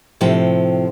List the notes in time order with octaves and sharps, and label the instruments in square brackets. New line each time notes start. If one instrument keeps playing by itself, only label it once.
[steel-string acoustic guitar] A2 C3 F3 G5